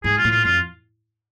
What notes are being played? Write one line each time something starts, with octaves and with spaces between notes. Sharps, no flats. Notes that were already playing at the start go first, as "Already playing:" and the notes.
G#2 G#4
F4
A2
F4
F2 F4